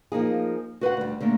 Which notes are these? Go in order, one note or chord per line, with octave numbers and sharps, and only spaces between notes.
F3 A#3 D#4 G#4
F#4 B4 C5 F#5
D2 G3
D3 G3 A3 A#3